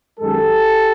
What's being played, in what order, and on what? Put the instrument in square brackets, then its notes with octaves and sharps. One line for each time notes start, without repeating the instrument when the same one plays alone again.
[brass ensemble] F#2 D#3 G#3 G4 A4